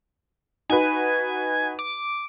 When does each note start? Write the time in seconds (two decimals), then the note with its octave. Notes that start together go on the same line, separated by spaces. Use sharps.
0.70 D#4 F#4 B4 G#5
1.79 D6